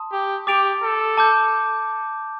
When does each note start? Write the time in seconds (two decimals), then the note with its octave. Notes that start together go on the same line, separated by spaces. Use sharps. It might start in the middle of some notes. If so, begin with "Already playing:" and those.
Already playing: A5 C6 D#6
0.13 G4
0.47 G4 D6 A6 D7 F7
0.83 A4
1.18 A5 D6 G6